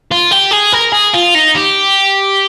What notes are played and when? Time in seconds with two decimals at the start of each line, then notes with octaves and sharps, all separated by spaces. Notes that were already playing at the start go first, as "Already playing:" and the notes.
0.12 F4
0.32 G4
0.52 G#4
0.73 A#4
0.92 G#4
1.14 F4
1.35 D#4
1.55 G4